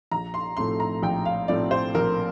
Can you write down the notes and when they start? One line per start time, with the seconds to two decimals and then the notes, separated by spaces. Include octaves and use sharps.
0.11 A#1 A#5
0.34 C6
0.57 A2 F3 A3 C4 C6
0.80 A#5
1.03 A#1 G5
1.26 F5
1.48 A2 F3 A3 C4 D5
1.71 C5
1.95 A#1 A#4